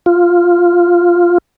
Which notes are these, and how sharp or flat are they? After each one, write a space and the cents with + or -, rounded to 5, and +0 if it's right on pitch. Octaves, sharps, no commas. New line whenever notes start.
F4 +0